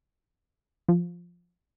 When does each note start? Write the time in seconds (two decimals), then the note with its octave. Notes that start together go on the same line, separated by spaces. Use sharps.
0.89 F3